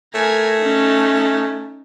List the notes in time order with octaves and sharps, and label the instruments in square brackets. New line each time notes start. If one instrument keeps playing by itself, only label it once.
[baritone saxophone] A3 [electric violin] A#4 G#5
[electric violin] C#4 D#4